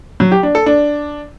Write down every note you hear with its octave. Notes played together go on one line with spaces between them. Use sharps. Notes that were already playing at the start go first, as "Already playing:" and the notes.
F#3
G4
D4
A4
D4